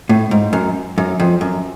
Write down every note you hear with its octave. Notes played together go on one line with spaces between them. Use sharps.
A2
G#2
F#2
F#2
F2
F#2